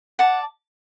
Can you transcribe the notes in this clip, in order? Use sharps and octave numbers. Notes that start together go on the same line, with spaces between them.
D5 F#5 A5